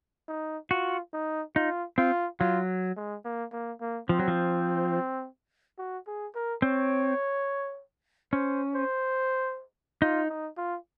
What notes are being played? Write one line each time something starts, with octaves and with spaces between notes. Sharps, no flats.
D#4
F4 F#4
D#4
D#4 F4
C4 F4
F#3 F4
G#3
A#3
A#3
A#3
F3 C4
F#3
F3
F#4
G#4
A#4
C4 C#5
C#4 C5
C5
D#4 F4
D#4
F4